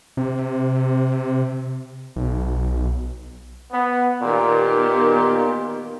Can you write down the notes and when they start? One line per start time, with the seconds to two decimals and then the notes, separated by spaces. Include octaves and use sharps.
0.17 C3
2.16 B1
3.72 B3
4.22 A#2 D#3 B3 G4